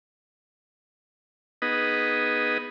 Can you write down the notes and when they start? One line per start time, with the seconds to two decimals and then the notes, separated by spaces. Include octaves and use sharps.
1.62 B3 D#4 G#4 B4 D#5 F#5